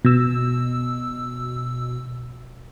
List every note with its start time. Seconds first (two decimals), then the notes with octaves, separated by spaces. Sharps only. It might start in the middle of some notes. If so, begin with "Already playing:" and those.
0.05 B2 E6